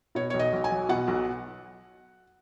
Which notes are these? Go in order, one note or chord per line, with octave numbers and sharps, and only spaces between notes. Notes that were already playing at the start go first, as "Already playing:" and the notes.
B2 C#5
B1 C#5
D#5
B1
G#5
F#3
B2 F#5
B1